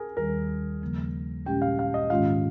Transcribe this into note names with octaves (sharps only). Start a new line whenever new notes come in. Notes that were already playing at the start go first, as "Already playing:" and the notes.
Already playing: G#4 A#4
D#2 D#3 G3 A#4
D#2 C#3 F3 A#3
A#2 G#3 C#4 G4 G5
F5
F5
D#5
G#2 D#3 G#3 C#4 F4 F5